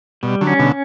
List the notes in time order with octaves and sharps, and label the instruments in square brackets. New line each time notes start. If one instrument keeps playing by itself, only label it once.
[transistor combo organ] B2 [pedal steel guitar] G3
[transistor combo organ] D3 F#3
[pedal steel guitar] C#4
[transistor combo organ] B2 D3